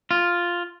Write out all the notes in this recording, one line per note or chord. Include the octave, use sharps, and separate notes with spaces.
F4